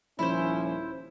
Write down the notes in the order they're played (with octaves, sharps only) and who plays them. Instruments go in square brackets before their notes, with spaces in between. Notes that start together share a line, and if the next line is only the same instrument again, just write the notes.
[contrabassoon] D#1 [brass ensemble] F3 C#4 [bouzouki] E4 C5